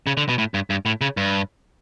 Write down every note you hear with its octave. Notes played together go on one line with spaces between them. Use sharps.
C#3
D3
B2
A2
G2
G2
A2
C#3
G2